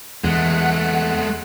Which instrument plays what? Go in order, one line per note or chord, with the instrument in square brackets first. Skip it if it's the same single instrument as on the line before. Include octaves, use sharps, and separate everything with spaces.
[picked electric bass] E2 [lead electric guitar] G#3 A3 [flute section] F#5 F#6